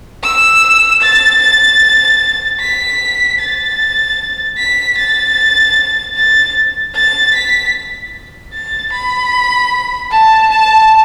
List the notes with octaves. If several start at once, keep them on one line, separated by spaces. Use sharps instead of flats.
E6
A6
A6
B6
A6
B6
A6
A6
A6
B6
A6
B5
A5
A5